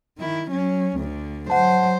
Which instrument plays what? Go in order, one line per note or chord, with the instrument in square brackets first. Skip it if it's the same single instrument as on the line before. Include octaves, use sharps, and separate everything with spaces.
[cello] D#3 E4
F#3 C#4
D2 D3
[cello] F#3 C5 [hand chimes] F#5 A5